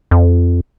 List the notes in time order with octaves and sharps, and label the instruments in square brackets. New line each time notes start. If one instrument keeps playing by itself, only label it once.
[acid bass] F2